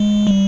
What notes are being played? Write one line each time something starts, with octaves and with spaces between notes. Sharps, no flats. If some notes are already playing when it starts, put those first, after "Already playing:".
Already playing: G#3
G3